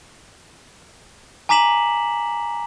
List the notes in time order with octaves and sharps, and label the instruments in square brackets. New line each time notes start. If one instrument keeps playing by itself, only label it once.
[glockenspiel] G#5 A#5 D6 B6 E7 F#7